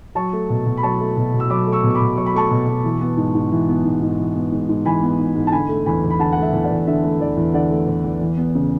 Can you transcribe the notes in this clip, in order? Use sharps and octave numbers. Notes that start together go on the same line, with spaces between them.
F#3 A5 C#6
A3
B2
B2
B5
F#3 A5 C#6
A3
B2
B2
E6
F#3 B5 D6
A3
C#6 E6
B2
C#6
B5 D6
B2
F#3 C#6
B5
A3 A5 C#6
B2
B2
E3
B3
G#2
G#2
E3
B3
G#2
G#2
E3
B3
G#2
G#2
E3 G#5 B5
B3
G#2
G#2
A5
D3 G#5 B5
A3
E2 G#5 B5
E2
B5
D3 F#5 A5
A3 F#5
E5
E2
D5 F#5
E2
D3 E5
A3
E2 D5
E2
D3 D5 F#5
A3
E2
E2
E3
B3
C#3